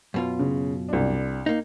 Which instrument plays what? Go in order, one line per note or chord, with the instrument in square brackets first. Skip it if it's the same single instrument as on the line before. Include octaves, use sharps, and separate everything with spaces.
[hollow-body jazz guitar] F#2 B2 F4
[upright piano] C#3
C2 D4
[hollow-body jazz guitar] A#3 D#4